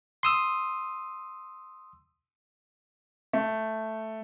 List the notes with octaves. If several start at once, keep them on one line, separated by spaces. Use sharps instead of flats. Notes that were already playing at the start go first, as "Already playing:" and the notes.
C6 D#6 E6
A3